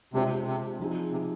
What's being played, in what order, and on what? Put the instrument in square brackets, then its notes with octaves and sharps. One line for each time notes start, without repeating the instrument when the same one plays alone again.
[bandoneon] C3 [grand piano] G#3 D4 F4 C5
[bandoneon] C3
[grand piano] F3 C4 D#4 G#4
[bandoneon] C3